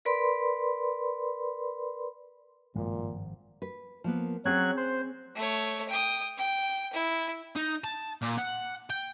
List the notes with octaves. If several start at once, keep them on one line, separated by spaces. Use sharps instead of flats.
A#4 B4 D5 B5 C6
G#1 G2 A#2 F3 G#3
B4
F3 A#3 B3
F#3 C4 C#4 G#4 F#6 G#6
C5
A3 C#5
G5 D#6
G5
E4
D#4
A5
A#2
F#5
G5